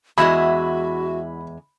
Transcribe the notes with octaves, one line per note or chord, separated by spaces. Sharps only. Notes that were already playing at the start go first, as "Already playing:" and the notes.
E2 G#3 E4 F#4 E5 F#5 B5